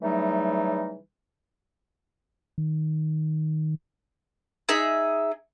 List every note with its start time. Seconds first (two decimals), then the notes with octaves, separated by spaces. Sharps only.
0.02 C#3 E3 F#3 G3 A3 D#4
2.58 D#3
4.69 D#4 G#4 E5